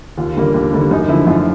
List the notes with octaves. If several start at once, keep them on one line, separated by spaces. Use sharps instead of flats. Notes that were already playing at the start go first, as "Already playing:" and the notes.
D#2 F4
D3 G3 A#3
D#2
D3 G3 A#3
F#2 D#4
D3 F3 E4
F#2 F4